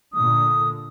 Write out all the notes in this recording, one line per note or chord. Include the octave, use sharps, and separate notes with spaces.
A#2 D3 D#6